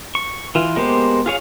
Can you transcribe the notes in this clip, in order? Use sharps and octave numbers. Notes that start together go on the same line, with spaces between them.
C#6
E3 F4
G#3 A#3 B3 G4 C5
F4 G#4 C#5 F5